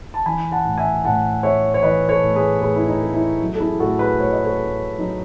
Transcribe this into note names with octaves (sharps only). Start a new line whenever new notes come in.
A5
E3 G#5 B5
F#5 A5
A2
E5 G#5
A2 F#5 A5
A3 C#5 E5
C#5
E3 B4 D#5
A4 C#5
A2
G#4 B4
A2 G#4 B4
E4
D#4
A3
E4
F#3
A4
E4 G#4
A2 F#4 A4
G#4 B4
A2 C#5
D#5
A4 C#5
A3
F#3 D#4